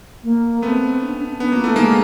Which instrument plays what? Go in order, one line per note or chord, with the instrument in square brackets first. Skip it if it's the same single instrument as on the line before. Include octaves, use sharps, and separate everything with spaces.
[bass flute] A#3
[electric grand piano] A3 B3 [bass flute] C4
[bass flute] D4
C#4
D4
[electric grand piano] B3 [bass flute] C#4
[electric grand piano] A#3 [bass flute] F4
[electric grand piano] A3 [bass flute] E4
[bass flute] D#4
[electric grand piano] G#3 A#3 [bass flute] D4